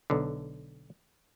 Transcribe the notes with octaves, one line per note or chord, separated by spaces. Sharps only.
B1 D3